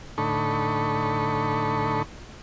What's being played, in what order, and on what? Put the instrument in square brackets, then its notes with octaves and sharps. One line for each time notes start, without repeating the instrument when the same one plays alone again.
[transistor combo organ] A2 D3 D#4 A4 B5 C#6